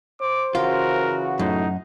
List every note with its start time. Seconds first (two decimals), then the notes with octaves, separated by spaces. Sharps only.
0.21 C5 D6
0.55 C#3 E3 F4 F#4 A#4
1.39 F#2 A2 D#4